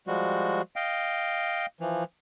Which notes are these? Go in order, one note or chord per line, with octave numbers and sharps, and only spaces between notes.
F3 G3 G#3 F#4
D#5 F5 G5
E3 F3